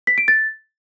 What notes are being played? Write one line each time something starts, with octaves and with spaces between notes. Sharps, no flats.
B6
D7
A6